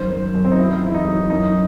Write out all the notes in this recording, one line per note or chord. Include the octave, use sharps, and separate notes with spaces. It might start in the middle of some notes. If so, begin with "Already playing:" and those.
Already playing: F#2 D#3 C5
F#2
F#2
C4
D#4
F#3 E4
E2 E4
D#4
F#3
F#2 D#4